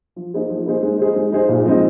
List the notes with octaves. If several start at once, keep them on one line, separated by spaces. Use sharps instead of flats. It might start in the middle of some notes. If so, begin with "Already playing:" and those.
F3
A#3 D#4 G#4 C5
F3
A#3 D#4 G#4 C5
G#3
D#4 G#4 C5
G#3
D#4 G#4 C5
A#2
F3 G#3 C4 D#4